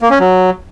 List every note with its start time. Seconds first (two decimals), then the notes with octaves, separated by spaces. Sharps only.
0.01 A#3
0.10 C#4
0.20 F#3